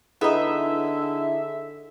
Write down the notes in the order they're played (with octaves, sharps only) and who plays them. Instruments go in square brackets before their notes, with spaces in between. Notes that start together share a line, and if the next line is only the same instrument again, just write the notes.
[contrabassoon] D3 [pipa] B3 D#4 [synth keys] E4 G#4 [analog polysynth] E5